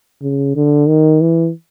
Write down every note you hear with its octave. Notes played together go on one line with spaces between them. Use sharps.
C#3
D3
D#3
E3